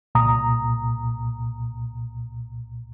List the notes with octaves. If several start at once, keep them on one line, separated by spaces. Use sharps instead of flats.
C2 A#2 A#5 D#6